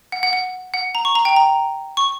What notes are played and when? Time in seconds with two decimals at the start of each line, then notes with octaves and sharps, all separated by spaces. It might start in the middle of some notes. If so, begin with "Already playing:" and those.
0.12 F#5
0.23 F#5
0.33 F#5
0.74 F#5
0.95 A#5
1.05 C#6
1.15 A#5
1.25 G5
1.36 A#5
1.97 C#6